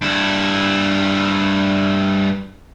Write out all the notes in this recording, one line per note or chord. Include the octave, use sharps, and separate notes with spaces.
G2 E4